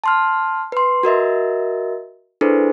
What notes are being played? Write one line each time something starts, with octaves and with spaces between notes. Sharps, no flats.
A5 C6 F6
B4 C6
F#4 A#4 D#5 E5
D4 E4 G#4 A4 B4 C5